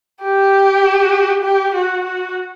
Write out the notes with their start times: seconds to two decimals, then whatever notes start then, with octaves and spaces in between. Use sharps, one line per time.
0.22 G4
1.44 G4
1.75 F#4
2.05 F#4